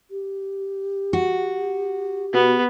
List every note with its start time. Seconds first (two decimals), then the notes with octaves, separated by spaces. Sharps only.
0.11 G4
1.13 F#4
2.34 B2 B3